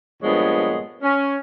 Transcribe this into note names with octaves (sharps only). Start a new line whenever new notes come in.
G2 A#2 F3 G#3 B3 C#5
C#4